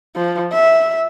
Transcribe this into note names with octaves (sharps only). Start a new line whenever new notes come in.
F3
E5